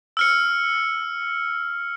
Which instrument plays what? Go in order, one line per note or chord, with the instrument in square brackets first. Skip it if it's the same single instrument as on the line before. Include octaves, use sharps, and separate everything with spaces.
[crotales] E6 F6 C#7